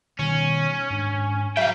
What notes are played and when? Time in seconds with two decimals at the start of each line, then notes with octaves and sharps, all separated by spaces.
0.19 B2 D#3 G3 C#4
0.90 G#2 D4
1.57 F#3 E5 F5 G5